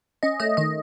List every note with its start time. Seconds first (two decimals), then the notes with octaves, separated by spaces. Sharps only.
0.23 C#4 D#5
0.40 A3 D#5
0.57 D#3 D#5